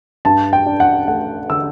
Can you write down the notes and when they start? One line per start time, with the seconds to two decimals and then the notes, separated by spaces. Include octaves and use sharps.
0.25 G2 A5
0.53 G5
0.66 D4
0.80 F#5
1.08 A3 F#5
1.50 D3 E6